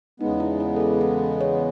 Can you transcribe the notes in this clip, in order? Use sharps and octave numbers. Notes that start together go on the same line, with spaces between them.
E2 C#3 G#3 B3 D#4
E4
E4
A4
G#4
A4
C#5